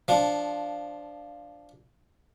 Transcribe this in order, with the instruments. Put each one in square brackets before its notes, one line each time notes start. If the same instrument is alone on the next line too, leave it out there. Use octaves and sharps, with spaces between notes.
[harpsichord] F3 D4